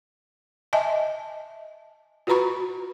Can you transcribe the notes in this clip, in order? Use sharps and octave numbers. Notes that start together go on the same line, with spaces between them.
D#5 E5 G#5 A5
F4 F#4 B4 A#5 B5 C#6